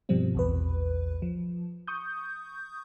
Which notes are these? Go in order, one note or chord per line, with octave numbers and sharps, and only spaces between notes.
G2 B2 F3 G3 C4
A#1 E2 B4
F3
C#6 D#6 G6